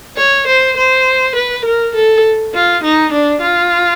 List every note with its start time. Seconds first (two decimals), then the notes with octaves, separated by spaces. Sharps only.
0.17 C#5
0.47 C5
0.77 C5
1.35 B4
1.65 A#4
1.94 A4
2.54 F4
2.84 D#4
3.13 D4
3.42 F4